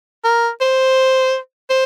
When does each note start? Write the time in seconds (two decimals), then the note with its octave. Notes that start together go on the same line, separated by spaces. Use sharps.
0.24 A#4
0.61 C5
1.70 C5